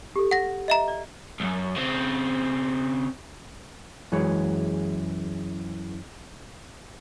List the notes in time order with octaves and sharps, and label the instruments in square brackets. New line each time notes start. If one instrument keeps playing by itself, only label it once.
[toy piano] G4 A4
[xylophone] F#5 A#6
D#5 E5 A#5
[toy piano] D5
[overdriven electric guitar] B1 F#2
C#3 C4
[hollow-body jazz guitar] F#2 E3 G#3 G#4 C#5